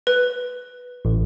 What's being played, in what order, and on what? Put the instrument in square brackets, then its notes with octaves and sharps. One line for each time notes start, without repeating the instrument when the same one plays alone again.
[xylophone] B4
[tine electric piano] A1